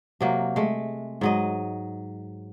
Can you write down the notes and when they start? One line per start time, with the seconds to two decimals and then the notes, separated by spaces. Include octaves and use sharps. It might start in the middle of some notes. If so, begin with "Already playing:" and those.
0.21 C3 F#3 A#3
0.56 G#3 A3
1.21 G#2 F#3 D#5